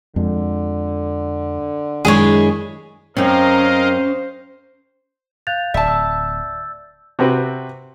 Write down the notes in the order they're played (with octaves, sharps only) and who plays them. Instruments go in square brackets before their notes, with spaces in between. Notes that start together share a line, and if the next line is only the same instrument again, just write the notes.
[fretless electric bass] F2 G#3 [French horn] D3
[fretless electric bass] F#2 D#3 [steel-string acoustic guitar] G#3 D4 E4 [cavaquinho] G#4 C#5
[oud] F#2 C4 [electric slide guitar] C#4 [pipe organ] A#4 D#5 F5 [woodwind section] C5
[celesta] F5 F#6 F7 [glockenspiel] G6 A6
[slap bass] D1 [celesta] D5 [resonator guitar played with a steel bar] E5 A5
[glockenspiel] E6
[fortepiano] C3 C4 F#4 B4